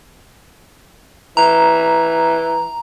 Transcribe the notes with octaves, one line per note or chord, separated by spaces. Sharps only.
E3 A#5